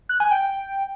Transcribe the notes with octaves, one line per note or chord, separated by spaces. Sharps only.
F#6
G#5
G5